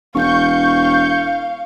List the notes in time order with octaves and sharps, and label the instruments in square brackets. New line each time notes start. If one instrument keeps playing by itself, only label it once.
[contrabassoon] E1 [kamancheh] F5 [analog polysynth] C#6 G6